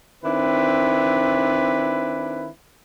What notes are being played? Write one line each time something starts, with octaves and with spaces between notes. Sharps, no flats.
D#3 C4 D4 E4 B4